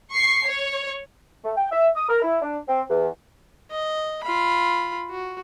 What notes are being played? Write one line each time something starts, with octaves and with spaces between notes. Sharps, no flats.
C#6 C7
C#5
A3
G5
E5
D#6
A#4
E4
D4
C4
E2
D#5
F4 B5
F#4